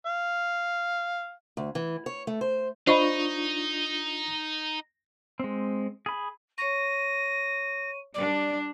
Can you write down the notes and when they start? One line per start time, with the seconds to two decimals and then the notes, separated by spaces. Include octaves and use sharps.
0.06 F5
1.57 D2
1.75 E3
2.06 C#5
2.27 A3
2.41 C5
2.87 D4 D#4 F4 C5 D#5 B5 C#6
5.40 G#3 C4
6.06 G#4 B5
6.58 C#5 C#6 A#6 D#7
8.14 G3 D4 D5